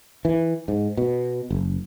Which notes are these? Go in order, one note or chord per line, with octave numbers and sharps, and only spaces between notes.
E3
G#2
B2
F#1